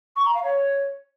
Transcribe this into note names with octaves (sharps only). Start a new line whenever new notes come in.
C#6
A#5
F5
C#5